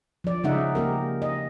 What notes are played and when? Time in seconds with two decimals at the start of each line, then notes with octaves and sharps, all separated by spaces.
0.24 F3 D5
0.44 C#3 G#3 C#4 D#4 E5 F#5
0.75 A#3 G4 A#4
1.22 D#5